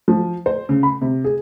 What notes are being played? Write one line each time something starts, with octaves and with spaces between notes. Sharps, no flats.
F3
C5
C#3
B5
C3
G#4